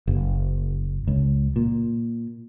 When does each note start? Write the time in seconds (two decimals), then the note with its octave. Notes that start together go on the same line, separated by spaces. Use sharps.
0.07 F#1
1.07 C#2
1.56 A#2